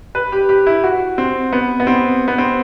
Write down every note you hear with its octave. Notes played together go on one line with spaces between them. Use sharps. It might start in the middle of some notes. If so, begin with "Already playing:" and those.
B4
G4
G4
E4
F#4
C4
B3
B3
C4
B3
C4